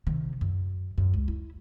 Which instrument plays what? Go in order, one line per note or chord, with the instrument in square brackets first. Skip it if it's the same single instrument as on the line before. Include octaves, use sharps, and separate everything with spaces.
[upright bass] C3 D#3
F#2
F#2
C#2
E4